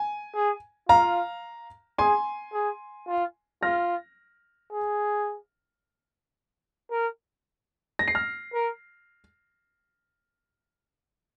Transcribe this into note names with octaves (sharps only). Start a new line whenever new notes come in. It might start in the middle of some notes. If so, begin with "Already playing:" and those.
Already playing: G#5
G#4
F4 F5 A#5
G#4 G#5 C6
G#4
F4
F4 F6 A#6
G#4
A#4
A#6
C7
F6 A#6
A#4